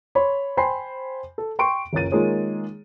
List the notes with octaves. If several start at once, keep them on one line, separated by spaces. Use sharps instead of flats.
C#5 B5 C6
C5 G5 G#5 B5 C6 C7
A4
G5 C6 C#6 D7
F#1 C#2 C#4 A#4 A6 D#7
D#3 G#3 A#3 F4 G#4 C#5